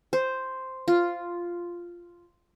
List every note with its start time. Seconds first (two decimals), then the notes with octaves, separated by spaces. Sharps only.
0.13 C5
0.88 F4